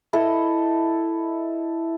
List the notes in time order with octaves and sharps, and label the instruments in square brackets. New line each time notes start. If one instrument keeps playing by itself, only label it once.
[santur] E4 A4 D#5